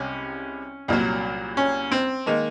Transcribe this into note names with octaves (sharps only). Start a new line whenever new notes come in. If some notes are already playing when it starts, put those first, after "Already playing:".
Already playing: C2 C3 G#3 C#4
C2 A#2 F#3
C#4
C4
D#3 G#3 A#3